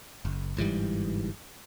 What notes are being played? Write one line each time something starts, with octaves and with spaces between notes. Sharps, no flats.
F#1
G1 G#2 E3 G3